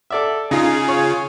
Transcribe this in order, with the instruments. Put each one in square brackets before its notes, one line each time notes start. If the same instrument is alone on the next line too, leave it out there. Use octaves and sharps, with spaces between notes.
[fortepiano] A4 D5 E5
[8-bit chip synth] C#3 F4 [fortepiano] D#4 [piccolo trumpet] G#4
[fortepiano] C#5